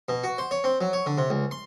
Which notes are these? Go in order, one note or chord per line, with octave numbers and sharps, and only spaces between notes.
B2
F#4
C5
C#5
C4
F#3
C#5
D3
C3
C#2
C6